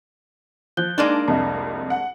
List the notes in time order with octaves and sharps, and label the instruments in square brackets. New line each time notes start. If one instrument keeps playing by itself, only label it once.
[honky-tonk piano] F3 [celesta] F#6 G6 G7
[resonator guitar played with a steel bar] G#3 A#3 D4 [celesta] D#4 [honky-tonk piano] D5 A5
[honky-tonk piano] C2 F2 D#5 [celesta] A5
[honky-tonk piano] F#5